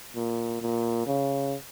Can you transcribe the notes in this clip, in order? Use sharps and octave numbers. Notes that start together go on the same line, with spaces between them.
A#2
A#2
C#3